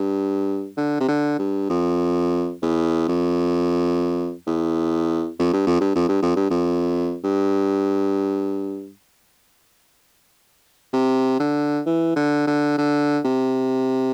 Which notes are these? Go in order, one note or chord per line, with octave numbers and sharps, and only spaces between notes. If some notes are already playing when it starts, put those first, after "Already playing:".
Already playing: G2
D3
C3
D3
G2
F2
E2
F2
E2
F2
G2
F2
G2
F2
G2
F2
G2
F2
G2
C3
D3
E3
D3
D3
D3
C3